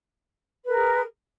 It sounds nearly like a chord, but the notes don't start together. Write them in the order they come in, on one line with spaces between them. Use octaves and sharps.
B4 A#4 G#4